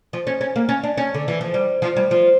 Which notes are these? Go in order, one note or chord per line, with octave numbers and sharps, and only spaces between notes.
F3
C#4
C#4
A#3
C#4
D4
C#4
D3
E3
F3
G3
F3
G3
F3